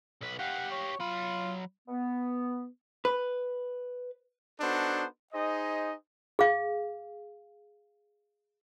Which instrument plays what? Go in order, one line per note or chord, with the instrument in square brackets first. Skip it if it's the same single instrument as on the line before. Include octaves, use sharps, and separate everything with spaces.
[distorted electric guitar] B1 B4
[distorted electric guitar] G4 F5 [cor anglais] F#5
[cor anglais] C#5
[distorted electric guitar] F#3 B5 [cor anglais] F4
[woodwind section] B3
[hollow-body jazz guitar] B4
[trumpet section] B3 D4 D#4 F#4 A4 C5
D#4 G#4 C5 D#5
[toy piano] G#4 F5